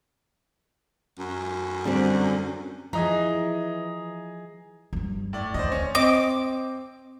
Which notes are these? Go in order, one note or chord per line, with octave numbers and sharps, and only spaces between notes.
F#2
D3 G3 C4
E3 F3 G#4 D#5 A#5
G2 F#3
A2 D5
D2 B3 C5 D5 D#5
C#4
C4 D#5 D6